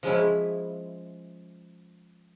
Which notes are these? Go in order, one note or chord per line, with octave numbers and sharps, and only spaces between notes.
F3 G#3 C#4 E4